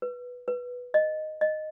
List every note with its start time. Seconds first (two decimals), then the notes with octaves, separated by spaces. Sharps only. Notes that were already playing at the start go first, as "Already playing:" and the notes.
0.02 B4
0.48 B4
0.94 D#5
1.41 D#5